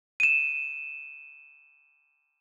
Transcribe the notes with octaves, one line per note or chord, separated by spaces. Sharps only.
D#7 E7